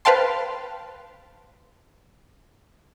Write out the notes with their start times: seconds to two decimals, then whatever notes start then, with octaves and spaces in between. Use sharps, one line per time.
0.05 B4 C5 F5 G5 A5 C6